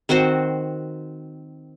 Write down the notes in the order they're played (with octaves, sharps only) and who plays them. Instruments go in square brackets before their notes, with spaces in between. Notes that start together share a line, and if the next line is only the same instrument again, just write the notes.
[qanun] D#3 C4 F#4 C5